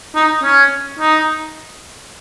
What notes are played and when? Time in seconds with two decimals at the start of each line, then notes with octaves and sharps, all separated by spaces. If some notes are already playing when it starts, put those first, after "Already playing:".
0.15 D#4
0.43 C#4
0.99 D#4